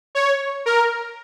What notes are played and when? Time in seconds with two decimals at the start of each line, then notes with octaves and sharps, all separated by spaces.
0.15 C#5
0.66 A#4